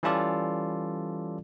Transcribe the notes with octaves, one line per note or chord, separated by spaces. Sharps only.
E3 G3 C#4 F4 A4 D5